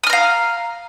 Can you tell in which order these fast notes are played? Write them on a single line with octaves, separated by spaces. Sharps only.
D#6 F6 A#5 F5